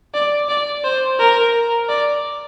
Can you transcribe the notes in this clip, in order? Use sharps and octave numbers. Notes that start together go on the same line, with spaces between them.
D5
D5
C5
A#4
D5